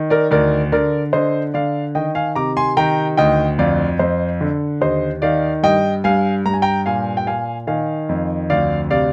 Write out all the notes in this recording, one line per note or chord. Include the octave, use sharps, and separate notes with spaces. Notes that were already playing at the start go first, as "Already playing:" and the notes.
Already playing: D#3
A#4 D5
D2 A#4 D5
D3 A#4 D5
D3 C5 D#5
D3 D5 F5
D#3 D#5 G5
F5 G#5
C3 A#5 D6
G#5 C6
D#3 G5 A#5
D2 D#5 G5
F2 D5 F5
F2 C5 D#5
D3
D#2 C5 D#5
D#3 D5 F5
G2 D#5 G5
G2 F5 G#5
G2 A#5
G#5
G5 A#5
A#2 F5 G#5
G5
A#2 F5 G#5
D#3 F5 G#5
F2
D2 D5 F5
C3 D5 F5